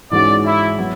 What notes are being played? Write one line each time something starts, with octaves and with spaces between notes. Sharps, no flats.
G#2 E3 G#3 C#4 F#4 D5
E4
F#3 B3